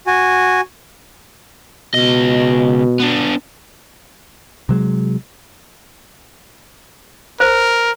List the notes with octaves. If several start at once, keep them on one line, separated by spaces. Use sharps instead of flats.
F#4 G#5
C#2 B2 D#5
B3 D4
C3 F#3 G#3
A#4 C5